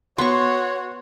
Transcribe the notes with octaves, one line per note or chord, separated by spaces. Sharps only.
B3 F#4 C#5 C6 C#6